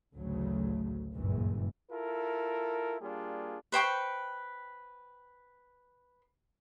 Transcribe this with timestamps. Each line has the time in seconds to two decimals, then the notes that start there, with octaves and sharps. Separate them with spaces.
0.14 A1 D2 C#3 F#3 A3
1.14 F#1 C#2 G2 A#2 E3
1.92 E4 F4 A4 A#4
3.01 G3 A#3 D4 F4 G#4
3.72 B4 C5 G5 C#6